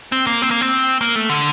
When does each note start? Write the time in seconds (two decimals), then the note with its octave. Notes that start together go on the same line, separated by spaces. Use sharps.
0.12 C4
0.27 A#3
0.42 C4
0.51 A#3
0.61 C4
1.01 A#3
1.15 A3
1.30 D3